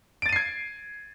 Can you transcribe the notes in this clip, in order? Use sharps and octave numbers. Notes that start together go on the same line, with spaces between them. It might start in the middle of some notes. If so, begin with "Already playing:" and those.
G#6 A6 C7 D7 D#7